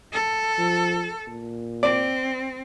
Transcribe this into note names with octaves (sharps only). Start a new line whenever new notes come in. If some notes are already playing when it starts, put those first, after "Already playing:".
A4
F3
A#2
C4 D5